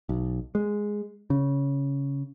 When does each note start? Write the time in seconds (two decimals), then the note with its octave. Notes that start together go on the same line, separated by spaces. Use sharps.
0.09 B1
0.55 G#3
1.30 C#3